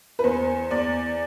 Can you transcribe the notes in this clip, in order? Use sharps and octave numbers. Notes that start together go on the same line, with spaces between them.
B4
E2 C5
E2 D5